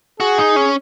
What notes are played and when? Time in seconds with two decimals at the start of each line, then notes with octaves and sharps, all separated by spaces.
0.20 F#4 G#4
0.38 D#4
0.56 C#4